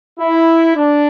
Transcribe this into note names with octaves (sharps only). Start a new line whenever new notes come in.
E4
D4